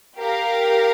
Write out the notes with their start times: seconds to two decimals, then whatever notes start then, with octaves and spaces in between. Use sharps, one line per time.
0.18 G4 A#4 F5